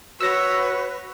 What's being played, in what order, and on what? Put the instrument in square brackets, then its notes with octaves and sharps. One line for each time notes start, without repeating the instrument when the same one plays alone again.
[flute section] F#4 [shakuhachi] B4 [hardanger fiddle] C#5 [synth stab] E6 A#6